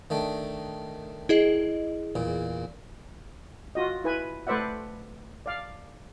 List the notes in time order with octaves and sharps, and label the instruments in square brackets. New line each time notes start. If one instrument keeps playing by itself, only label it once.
[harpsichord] D#3 A3 D4
[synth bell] E4 G#4 D#5
[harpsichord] E2 A#2
[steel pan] F4 F#4 D#5
E4 B4 G#5
A3 B4 C5 D5 E5 F#5
D5 F5